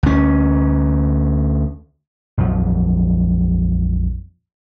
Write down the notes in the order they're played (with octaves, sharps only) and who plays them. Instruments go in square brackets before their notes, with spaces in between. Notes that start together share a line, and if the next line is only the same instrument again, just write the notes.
[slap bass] D2 C#4
A#1 F2 F3 F#3